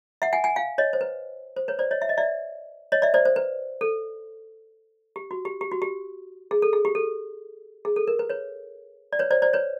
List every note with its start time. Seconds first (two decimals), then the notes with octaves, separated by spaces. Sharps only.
0.22 E5 F#5
0.33 F#5 G#5
0.44 F#5 G#5
0.56 F5 G5
0.78 C#5 D#5
0.93 C5
1.01 B4
1.56 C5
1.68 B4 C#5
1.79 C5 D5
1.91 C#5 D#5
2.02 E5
2.09 D#5
2.18 D5 E5
2.92 C#5 D#5
3.02 D5 E5
3.14 C5 D5
3.25 C5
3.36 B4
3.81 A4
5.16 G4
5.31 F#4
5.45 G4
5.61 G4
5.72 F#4
5.82 G4
6.51 G#4
6.62 A4
6.73 G#4
6.85 G4
6.95 A4
7.85 G#4
7.96 A4
8.07 A#4
8.19 B4
8.30 B4 C#5
9.13 D5
9.19 B4 C#5
9.31 C5 D5
9.42 C5 D5
9.53 B4 C#5